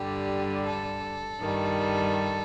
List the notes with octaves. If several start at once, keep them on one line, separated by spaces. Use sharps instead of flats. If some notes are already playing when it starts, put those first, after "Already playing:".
Already playing: G2 D3 G3 G4
A4
G2 D#3 G3